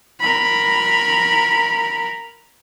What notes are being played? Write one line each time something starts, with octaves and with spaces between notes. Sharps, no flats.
A#4 B5